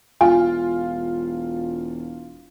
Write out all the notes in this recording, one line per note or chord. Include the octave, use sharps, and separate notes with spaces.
E1 F4 G#5